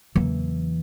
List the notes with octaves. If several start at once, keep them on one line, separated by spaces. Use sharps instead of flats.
E2 C#3 E3 F#3 A#3